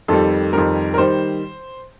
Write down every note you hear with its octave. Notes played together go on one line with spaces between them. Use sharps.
F2 D#3 G3 A4
F2 D#3 G3 A#4
A#4
D#3 G3 C5